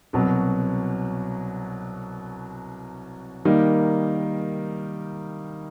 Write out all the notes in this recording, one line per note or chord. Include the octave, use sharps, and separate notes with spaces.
C2 B2 F#3
D#3 G3 A#3 D#4